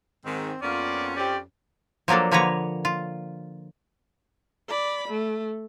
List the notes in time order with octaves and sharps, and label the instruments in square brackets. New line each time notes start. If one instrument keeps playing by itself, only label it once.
[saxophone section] G#2 D#3 [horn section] C4
[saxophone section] F2 C#4 [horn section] A#3 B3 F4 [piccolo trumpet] D5
[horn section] C4 G4 [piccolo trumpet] D5
[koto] F3 F#3 A#3 D4 A4
D3 F3 A#3 B4 C#5 A#5
F4
[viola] D5 B5
A3